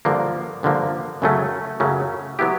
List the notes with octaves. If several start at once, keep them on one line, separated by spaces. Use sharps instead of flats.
G2 D3 F3 A#3
G2 D3 F3 A#3
F#2 C#3 F#3 A3 C#4
F#2 C#3 F#3 A3 C#4
F#3 B3 E4 G4